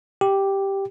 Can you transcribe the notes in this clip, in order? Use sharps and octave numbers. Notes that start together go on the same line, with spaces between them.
G4